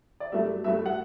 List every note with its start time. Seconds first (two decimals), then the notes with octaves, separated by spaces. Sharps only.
0.20 D5
0.32 G2 F#3 A3 E5
0.64 G2 F#3 A3 E5
0.86 F#5